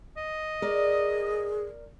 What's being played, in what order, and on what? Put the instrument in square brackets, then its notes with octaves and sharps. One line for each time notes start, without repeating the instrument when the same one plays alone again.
[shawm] D#5
[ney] G#4 [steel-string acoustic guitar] A#4 D5